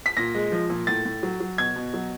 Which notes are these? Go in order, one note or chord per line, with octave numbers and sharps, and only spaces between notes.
B6
A#2 A#6
G#3
F3
A#2
A2 A6
A2
F#3
F#3
B2 G#6
B2
F#3